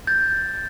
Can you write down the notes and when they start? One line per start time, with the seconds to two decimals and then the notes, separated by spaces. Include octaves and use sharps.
0.07 G6 A6